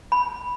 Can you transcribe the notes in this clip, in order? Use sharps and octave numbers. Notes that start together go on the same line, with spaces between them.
B5